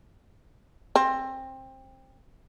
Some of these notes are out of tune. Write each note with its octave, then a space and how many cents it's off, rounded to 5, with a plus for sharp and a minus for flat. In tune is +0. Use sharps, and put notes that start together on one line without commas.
C4 +20